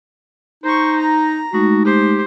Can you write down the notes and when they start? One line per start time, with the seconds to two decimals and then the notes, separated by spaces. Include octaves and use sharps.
0.64 D#4 C5 C#6
0.99 A#5
1.53 G#3 A3 D#4 F#4
1.85 G4 C5